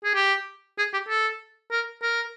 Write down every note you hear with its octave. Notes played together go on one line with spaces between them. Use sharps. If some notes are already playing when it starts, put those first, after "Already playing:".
G#4
G4
G#4
G4
A4
A#4
A#4